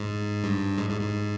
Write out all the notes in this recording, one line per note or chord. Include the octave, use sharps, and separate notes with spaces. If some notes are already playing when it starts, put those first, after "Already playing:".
Already playing: G#2
G2
G#2
G#2
G#2